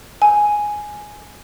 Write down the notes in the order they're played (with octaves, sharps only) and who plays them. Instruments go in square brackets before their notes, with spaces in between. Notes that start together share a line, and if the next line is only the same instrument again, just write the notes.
[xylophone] G#5